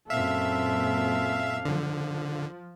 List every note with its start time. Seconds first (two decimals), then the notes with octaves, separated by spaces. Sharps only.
0.10 F#2 A#2 C4 A4 E5 F5
1.65 D3 F3